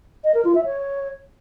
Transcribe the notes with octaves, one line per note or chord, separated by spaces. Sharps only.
D#5
A#4
F4
E5
C#5